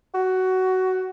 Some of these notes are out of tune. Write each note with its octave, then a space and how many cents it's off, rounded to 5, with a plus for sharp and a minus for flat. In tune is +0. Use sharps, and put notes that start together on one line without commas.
F#4 +15